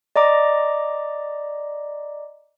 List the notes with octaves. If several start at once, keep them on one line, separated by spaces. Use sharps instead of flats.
D5 D#5 A#5 D6